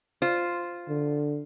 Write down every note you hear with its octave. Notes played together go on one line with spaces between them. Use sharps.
F4 C5
D3